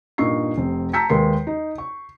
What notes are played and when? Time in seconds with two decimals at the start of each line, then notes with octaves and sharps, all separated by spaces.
0.18 G2 A#2 D#4 C#6 C7
0.58 F1 C4
0.93 A5 A#5 E6 G6 B6 C#7
1.10 D#2 G#3 A#4 B4 C6 C7
1.47 D#4
1.78 C#6